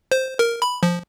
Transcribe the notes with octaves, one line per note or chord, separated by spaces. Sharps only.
C5
A#4
B5
F3